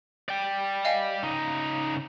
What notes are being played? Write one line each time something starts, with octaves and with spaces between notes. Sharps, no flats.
D5 G5
D#5 F5 G#5
C#3 D#4